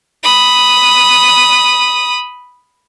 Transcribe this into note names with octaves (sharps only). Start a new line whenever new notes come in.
B5 D#6